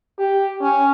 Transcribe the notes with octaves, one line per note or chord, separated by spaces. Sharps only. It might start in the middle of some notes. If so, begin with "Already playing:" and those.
G4
C#4